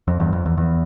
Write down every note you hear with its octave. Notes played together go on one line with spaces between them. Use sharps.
F2
E2 G2
F2
E2
E2